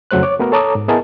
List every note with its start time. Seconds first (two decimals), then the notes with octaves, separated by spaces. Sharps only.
0.11 F2 C#3 F#3 A3 C5 F#6
0.23 C#5 D6
0.40 A3 B3 F#4 A#4
0.52 A4 C#5 A5 A#5 D6 D#6
0.75 G#2
0.88 B3 E4 G#4 A#4 D#5 A5